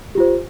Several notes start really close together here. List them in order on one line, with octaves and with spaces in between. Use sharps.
G4 F4 C5